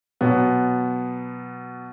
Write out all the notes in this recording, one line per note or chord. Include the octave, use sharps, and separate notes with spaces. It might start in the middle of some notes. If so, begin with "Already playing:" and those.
B2 F#3 B3